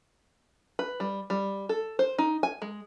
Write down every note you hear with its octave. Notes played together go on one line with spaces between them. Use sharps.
B4
G3
G3
A4
C5
D#4
G#5
G#3